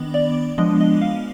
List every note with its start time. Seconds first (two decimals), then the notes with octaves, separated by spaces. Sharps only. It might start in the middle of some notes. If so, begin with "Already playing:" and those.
Already playing: D#3 B3 D4
0.14 D5
0.58 F3 G#3 B3 D4 D#5
0.81 D#5
1.01 F5